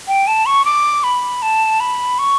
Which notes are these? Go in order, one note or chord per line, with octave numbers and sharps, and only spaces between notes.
G5
A5
C#6
D6
B5
A5
B5
C#6